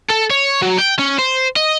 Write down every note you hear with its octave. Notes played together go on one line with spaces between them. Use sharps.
A4
C#5
F#3
G5
C#4
C5
D#5